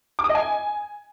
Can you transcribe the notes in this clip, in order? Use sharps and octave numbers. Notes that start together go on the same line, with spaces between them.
D6
D#6
D#5
G#5